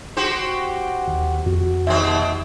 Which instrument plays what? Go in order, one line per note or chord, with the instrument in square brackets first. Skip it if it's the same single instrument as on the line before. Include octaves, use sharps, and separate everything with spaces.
[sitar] F#4 G4 C5
[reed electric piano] D#2
[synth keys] F2 [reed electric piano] F#4
[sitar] D#2 B2 C4 [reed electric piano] E5